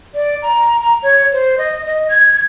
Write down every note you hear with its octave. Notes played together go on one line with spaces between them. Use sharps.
D5
A#5
A#5
C#5
C5
D#5
D#5
G#6